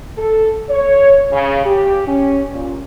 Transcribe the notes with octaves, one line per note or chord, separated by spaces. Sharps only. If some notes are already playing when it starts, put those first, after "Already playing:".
A4
C#5
C#3
G4
C#4
A#2